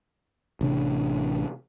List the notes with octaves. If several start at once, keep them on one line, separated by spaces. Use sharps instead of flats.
A1 C3 D4